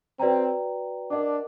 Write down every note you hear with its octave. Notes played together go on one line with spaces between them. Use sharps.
C4 F#4 B4 D5 G5 A#5
D4 A#4 D#5 F#5 A5 D6